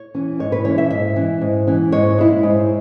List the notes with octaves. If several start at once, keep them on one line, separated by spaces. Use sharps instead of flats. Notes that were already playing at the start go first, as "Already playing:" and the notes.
Already playing: C#5
E3 C#4
G#2 C#5
B4
E3 C#4 C#5
E5
G#2 E5
E3 C#4
G#2
E3 C#4
G#2 C#5
G#3 E4
G#2